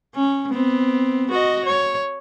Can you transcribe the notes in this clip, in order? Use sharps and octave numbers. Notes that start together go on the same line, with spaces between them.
C#4
B3 C4
F#4 D#5
C#5